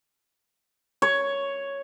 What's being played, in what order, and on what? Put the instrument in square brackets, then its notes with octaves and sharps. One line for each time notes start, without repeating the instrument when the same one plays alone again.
[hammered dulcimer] C#5